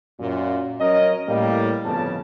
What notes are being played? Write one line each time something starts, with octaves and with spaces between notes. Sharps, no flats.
F#2 A#2
F#3 C#4 A#4 D#5
A2 G3 A#3
G1 F2 C#3 B3 A5